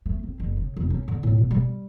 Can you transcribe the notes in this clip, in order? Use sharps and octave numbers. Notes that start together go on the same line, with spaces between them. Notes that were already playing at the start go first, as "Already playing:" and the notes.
A3
C4
F#1
C#3
F1
C#4
D3
A2
B2
G3